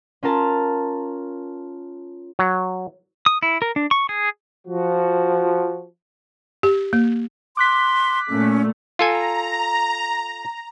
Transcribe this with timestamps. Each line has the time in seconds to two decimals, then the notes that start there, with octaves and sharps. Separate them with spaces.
0.23 C#4 F4 A#4 A5
2.39 F#3
3.26 D#6
3.43 E4
3.62 A#4
3.76 D4
3.91 C#6
4.09 G#4
4.66 F3 F#4
6.63 G4
6.93 A#3
7.57 C6 D6 F#6 B6
8.29 A#2 A3 C#4
8.99 F4 A4 G#5 A#5